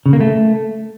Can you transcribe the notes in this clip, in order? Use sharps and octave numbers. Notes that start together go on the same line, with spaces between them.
C#3
A#3
A3